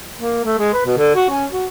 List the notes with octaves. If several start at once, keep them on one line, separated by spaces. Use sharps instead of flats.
A#3
A3
G#3
B4
B2
D3
F#4
C#4
F#4